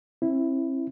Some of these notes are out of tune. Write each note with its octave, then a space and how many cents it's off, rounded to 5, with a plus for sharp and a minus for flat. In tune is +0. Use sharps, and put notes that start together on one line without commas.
C4 +40 E4 +0